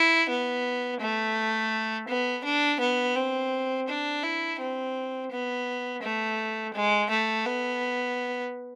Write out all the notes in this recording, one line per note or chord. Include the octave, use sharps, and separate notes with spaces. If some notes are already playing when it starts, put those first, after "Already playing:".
Already playing: E4
B3
A3
B3
D4
B3
C4
D4
E4
C4
B3
A3
G#3
A3
B3